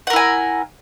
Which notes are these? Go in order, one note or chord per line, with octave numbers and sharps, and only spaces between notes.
E4 A#4 F#5 G#5